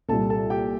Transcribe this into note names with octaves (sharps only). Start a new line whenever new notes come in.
C2 A#2 G3 A4 A5
A4 A5
G4 G5